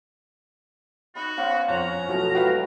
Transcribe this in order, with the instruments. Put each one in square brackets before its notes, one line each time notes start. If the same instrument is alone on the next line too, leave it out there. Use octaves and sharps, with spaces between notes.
[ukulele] D#4 D#5 B5 [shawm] F#4
[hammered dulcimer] B3 C#4 C5 [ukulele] F5
[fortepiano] F2 [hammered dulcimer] C#5 [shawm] A#5
[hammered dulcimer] B2 A3 [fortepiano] F3 F#3 E4
[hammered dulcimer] F3 G#3 [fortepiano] F#4 B4 F5 [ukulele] G4